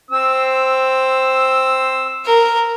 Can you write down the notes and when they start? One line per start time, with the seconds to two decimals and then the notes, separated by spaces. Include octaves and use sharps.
0.11 C4 C5 E6
2.26 A#4